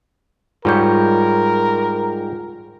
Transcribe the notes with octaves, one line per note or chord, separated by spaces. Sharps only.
G#2 G3 F4 A#4 C#5 G6